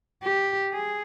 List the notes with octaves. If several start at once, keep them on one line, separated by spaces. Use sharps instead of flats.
G4
G#4